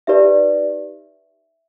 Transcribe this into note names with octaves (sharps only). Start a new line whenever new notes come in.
D#4 G4 B4 D5 E5